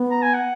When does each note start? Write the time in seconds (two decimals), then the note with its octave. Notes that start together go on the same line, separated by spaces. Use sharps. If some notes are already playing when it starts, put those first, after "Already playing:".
Already playing: B3
0.11 A#5
0.23 G#5
0.34 F#5